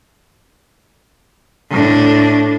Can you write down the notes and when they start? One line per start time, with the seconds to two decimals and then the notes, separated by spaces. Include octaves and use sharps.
1.70 A2 D4